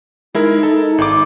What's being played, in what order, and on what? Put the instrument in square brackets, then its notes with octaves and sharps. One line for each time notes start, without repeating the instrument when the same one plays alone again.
[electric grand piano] G#3 E4 A#4 [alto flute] D#4
[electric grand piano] A4
G#1 D6